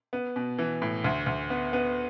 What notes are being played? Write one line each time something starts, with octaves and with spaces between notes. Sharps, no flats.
B3
B2
E3
A2
D2
D2
B3
B3